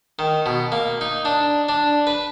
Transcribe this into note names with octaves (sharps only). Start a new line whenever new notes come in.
D#3
B2
A#3
D#4
D4
D4
B4